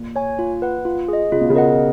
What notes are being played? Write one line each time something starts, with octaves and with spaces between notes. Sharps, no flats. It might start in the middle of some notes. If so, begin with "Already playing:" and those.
Already playing: A#2
C#5 G#5
F4
B4 F#5
F4
G#4 D#5
C#3 F4
B2
C#3
A#4 D#5 F#5